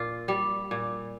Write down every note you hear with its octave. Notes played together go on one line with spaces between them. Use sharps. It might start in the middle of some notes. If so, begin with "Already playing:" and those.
Already playing: A#2 F4
G3
A#2